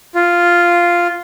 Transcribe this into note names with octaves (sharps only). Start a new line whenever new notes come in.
F4